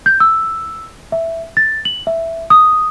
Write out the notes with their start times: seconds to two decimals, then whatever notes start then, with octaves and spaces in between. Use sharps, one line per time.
0.06 G6
0.20 E6
1.12 E5
1.57 A6
1.85 F#7
2.07 E5
2.50 D#6